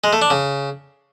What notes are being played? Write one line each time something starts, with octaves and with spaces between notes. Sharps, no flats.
G#3
A3
D4
C#3